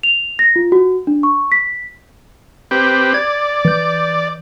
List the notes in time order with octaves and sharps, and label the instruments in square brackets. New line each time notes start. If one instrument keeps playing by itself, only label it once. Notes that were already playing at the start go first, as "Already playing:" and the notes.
[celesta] F7
A#6
F4
F#4
D4
C#6
B6
[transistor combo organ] C4 G4 B4
[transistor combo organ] D5 [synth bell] G#6
[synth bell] E3 G6